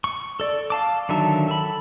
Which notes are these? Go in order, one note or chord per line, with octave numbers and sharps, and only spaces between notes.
C#6
A4 D5
F5 A5 D6
D3 D#3 F#3 E5 A5
A4 B5